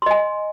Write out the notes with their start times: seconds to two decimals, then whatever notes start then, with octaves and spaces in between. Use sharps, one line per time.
0.02 C6
0.06 D#5
0.11 G#5